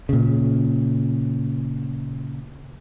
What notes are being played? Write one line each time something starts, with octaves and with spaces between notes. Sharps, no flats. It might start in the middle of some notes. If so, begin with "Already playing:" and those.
A#2 C#3